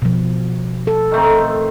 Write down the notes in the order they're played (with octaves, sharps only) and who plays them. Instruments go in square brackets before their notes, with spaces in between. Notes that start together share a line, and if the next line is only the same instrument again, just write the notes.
[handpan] B2 F3
A4
[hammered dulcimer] D#3 A3 C4